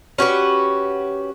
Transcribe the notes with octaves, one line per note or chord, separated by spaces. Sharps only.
C#4 F#4 G4 B4